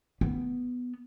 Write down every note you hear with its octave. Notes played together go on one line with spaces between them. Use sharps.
B3